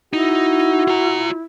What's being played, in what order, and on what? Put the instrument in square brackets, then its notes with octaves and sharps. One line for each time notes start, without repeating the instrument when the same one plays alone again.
[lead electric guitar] D#4 [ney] E4 [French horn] F#4
[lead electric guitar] F4 A#5